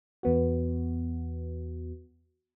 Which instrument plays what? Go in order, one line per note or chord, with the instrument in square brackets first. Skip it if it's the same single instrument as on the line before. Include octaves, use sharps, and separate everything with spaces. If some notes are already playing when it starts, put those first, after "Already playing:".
[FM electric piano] E2 B3 F#4